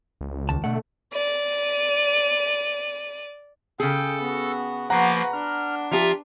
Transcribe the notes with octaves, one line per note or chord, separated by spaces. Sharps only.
C#2
D#2 A5
B2 D3 A3 F#5
D5 D#7
C#3 G#4 A4 G5
B3 F#4
F3 A#3 F#4 B4 F#5 A#5
D4 F6
F3 F4 G4 E5 A#5